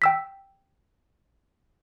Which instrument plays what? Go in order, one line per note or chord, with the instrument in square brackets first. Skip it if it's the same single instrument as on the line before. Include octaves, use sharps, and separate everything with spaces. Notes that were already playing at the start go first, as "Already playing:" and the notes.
[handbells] G5 E6 B6